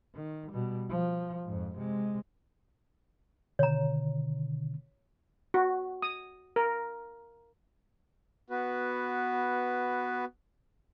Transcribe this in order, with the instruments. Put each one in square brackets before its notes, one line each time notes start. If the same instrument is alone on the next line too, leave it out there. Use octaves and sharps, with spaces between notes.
[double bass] D#3
B2 G3
F3
F2 G#2
C3 G#3
[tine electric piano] B2 D3 D#3 [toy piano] C#5 A#5
[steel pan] F#4
D#6
A#4
[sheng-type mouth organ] B3 F#4 B4